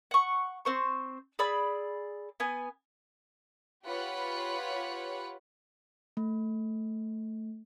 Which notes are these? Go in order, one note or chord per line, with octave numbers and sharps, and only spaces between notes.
F#5 C#6
C4 C5 C#6
G#4 D5 B5 E6
B3 G#5
F4 G4 B4 C#5 F#5 B5
A3